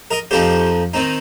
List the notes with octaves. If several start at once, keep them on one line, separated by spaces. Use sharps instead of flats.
A#4 D#5
F2 F3 D#4 G4 C5
D#3 C4 D#4